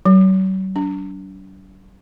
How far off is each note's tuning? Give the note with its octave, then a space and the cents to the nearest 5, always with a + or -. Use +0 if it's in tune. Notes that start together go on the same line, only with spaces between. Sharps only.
F#3 +45
D4 -40